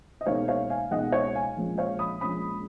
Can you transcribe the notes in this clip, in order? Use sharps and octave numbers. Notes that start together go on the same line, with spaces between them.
D#5
C#2 B2 A#3 D#4 C#5 F5
C#5 F5
F5 G#5
C#2 B2 A#3 D#4 D#5 F#5
C#5
F5 G#5
A#1 A#2 G#3 C#4
C#5 F5
B5 D#6
A#1 A#2 G#3 C#4 B5 D#6